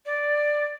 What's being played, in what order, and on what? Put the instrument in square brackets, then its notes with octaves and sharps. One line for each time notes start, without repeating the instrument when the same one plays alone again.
[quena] D5